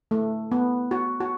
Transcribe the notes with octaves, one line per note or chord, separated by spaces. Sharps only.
A3
B3
F#4
F#4